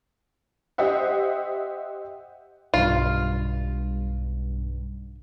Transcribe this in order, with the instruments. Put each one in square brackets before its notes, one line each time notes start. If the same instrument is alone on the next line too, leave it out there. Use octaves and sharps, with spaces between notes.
[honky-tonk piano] G4 C5 D#5 E5 F#5
[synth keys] B1 G2 [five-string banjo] F4